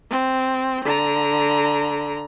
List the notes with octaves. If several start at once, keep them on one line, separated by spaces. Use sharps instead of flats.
C4
D3 A#5